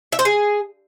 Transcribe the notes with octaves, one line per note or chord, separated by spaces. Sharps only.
E5
C5
G#4